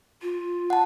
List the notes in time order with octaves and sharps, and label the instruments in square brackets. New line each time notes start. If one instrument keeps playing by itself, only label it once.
[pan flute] F4
[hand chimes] F#5 A5